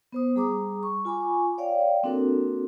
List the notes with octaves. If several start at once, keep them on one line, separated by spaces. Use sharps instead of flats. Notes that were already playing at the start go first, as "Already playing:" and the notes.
B3 C5 D#6
G3 G#4 A#5 D6 D#6
C#6
F4 G#5 B5 C#6 D6
C#5 D5 F5 G5
A#3 C4 D4 F#4 A4 A#4